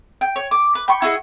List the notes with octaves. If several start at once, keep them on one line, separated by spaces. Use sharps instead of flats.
G5
C#5
D6
B4
G5 B5 C#6
E4 F#4 G#4 D#5